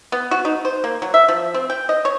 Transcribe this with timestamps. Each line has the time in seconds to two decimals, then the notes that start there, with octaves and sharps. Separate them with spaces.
0.12 B3
0.31 F#4
0.45 D#4
0.65 C5
0.84 A#3
1.02 F#3
1.14 E5
1.29 F3
1.54 C4
1.70 G5
1.89 D#5
2.05 C#5